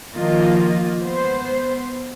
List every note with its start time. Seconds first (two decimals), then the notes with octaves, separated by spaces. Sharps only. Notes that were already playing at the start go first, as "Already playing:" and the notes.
0.14 D#3 F3 A#3 F4 D#5
1.00 B3 C5